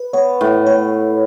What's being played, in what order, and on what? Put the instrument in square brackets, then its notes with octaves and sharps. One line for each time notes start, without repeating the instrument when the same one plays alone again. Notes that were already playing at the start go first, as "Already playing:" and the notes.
Already playing: [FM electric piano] B4
[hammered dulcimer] B3 [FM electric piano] C#5
[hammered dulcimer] A2
[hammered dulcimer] A2 [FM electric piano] C#5